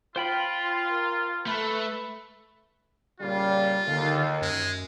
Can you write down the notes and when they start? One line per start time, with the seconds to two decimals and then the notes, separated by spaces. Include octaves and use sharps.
0.16 F4 C5 G5 B5
0.89 A#4
1.47 A3 B4
3.20 A#2 C#3 G3 F4
3.87 D#2 D3
4.41 F#2 G#3